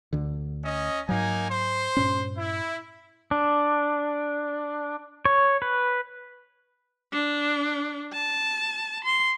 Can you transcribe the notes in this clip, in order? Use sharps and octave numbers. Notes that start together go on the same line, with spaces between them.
D2 D3
C#4 D#5
G#2 F#3 A#3 D#4 G#5
C5 C6
G2 A#2 C#4
E4
D4
C#5
B4
D4
A5
C6